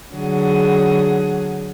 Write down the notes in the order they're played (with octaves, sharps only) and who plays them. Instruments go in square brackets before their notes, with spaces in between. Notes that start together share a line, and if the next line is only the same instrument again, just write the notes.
[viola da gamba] D3 F#3 G#4